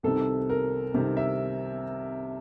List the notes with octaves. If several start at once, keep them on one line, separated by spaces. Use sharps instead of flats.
C2 C3 D#3 A4
A#4
C2 C3 D#3
E5